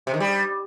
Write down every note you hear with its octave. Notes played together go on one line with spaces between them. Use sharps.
C3
D#3
G3